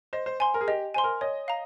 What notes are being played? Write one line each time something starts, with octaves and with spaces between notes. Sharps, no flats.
C5 D#5
C5
C5 G#5 C6
A#4
G#4
G4 D#5
C5 G#5 C6
A#4
C#5 D#5
F5 A#5